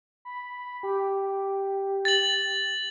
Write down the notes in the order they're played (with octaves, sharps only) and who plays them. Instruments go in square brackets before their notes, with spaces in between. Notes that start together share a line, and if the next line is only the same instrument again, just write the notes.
[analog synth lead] B5
G4
[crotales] A6 F#7